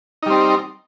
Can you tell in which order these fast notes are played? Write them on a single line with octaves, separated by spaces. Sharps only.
D#4 G3 C4